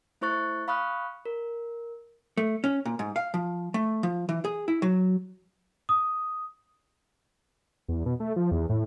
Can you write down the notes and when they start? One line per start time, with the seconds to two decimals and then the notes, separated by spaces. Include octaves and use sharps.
0.21 A3 E4 C5 C#6 F#6 A6
0.68 F5 B5 C#6 D#6 F6 F#6
1.26 A#4
2.37 A3
2.64 C#4
2.86 A#2
2.99 G#2
3.16 F5
3.34 F3
3.74 A3
4.03 F3
4.29 E3
4.45 G#4
4.68 E4
4.82 F#3
5.89 D#6
7.88 E2
8.06 B2
8.20 A3
8.36 F3
8.51 E2
8.69 A2